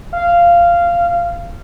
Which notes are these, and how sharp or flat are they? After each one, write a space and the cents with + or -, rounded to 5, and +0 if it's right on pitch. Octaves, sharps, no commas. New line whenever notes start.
F5 -15